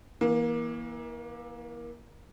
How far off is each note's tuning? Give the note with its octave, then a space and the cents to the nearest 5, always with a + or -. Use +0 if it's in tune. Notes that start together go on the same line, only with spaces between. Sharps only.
E3 -20 A#3 +25